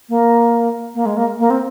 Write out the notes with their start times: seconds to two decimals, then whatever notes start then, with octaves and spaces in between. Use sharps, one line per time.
0.09 A#3
0.94 A#3
1.05 G#3
1.16 A#3
1.39 A#3
1.50 C4